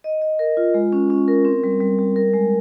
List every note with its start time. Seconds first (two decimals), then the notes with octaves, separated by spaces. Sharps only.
0.04 D#5
0.22 D#5
0.39 A#4
0.57 F4
0.74 G#3
0.92 C#4
1.10 C#4
1.28 A#4
1.45 C4
1.64 G3
1.80 G3
1.99 G3
2.16 A#4
2.34 G#3